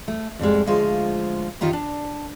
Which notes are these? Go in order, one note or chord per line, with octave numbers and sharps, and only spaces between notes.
A3
F2 A2 G3 G#3
D2 F3 G#3 F4 C5
F#2 D#3 F4 G4 A#5
D4